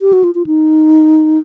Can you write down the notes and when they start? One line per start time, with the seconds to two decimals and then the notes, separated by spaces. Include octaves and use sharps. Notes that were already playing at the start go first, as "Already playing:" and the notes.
0.01 G4
0.13 F#4
0.24 F4
0.35 F4
0.47 D#4